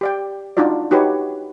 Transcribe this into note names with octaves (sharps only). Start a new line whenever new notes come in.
G4 D5 G5
D4 D#4 F4 F#4 D5
D#4 F#4 G4 B4 C#5